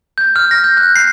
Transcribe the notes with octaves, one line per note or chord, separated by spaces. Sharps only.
G6
F6
A#6
G6
F#6
C7